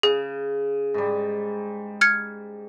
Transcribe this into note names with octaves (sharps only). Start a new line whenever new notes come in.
C#3 G#4
G#2 G3
F6 G#6 C#7